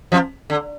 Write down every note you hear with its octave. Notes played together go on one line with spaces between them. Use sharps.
F2 F3
D3